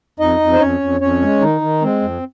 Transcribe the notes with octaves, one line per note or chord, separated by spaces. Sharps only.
F2 D#4 D#5
F2
C5
F2 C#4 C#5
F2
F2 C#4 C#5
G#3
D#3 D#4
D#3
G#3 C4
F2